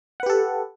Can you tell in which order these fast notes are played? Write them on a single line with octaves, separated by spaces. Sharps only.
F#5 B4 G4 A4